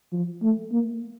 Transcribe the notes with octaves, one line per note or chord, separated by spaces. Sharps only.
F3
A3
A#3